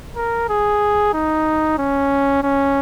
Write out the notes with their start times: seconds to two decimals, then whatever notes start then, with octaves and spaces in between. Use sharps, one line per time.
0.16 A#4
0.49 G#4
1.13 D#4
1.78 C#4
2.43 C#4